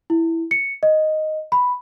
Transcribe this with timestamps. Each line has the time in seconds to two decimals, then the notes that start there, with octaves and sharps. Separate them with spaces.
0.10 E4
0.51 C#7
0.83 D#5
1.52 B5